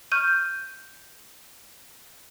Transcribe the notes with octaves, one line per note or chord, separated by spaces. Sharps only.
C#6 F6 G6 D#7